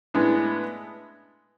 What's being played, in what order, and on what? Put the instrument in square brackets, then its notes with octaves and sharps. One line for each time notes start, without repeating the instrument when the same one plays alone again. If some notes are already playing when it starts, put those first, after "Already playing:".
[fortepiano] A2 G#3 B3 D4